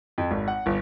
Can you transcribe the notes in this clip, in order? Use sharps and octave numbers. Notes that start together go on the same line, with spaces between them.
F2
G#1
F#5
G1